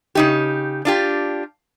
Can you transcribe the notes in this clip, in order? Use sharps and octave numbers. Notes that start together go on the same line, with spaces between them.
C#3 D#4 G4
D4 F4 G4